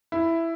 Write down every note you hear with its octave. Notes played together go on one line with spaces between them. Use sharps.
E4